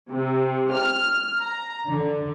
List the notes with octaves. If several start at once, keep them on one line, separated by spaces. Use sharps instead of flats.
C3
F6
A#5
D3